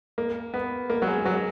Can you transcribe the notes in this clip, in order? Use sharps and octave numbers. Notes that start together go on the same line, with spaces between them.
A#3
B3
A#3
F#3
G#3
F#3